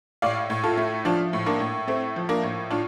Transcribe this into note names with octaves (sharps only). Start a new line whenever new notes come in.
A2 D5 F5
A2
F4 A4
A3
F3 D4 F4
A2
A#3 D4
A2
A3 C4
F3
A#3 D4
A2
A2 D4 F4